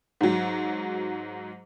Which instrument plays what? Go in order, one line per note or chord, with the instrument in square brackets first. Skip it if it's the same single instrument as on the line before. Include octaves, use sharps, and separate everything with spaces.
[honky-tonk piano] G#2 F#3